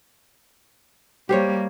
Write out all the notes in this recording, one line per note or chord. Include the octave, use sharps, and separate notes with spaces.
G3 A#3 G4 C5 C#5